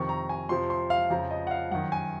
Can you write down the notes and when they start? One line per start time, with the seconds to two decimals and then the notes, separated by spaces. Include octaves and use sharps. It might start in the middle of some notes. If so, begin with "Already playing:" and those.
Already playing: F2 C3 D#3 C#6
0.09 A#5
0.29 G#5
0.49 F2 C3 F3 C6
0.70 C6
0.90 F5
1.10 F2 C#3 F3 A#5
1.31 D#5
1.47 F#5
1.51 F5
1.71 F#2 D#3 F#5
1.92 G#5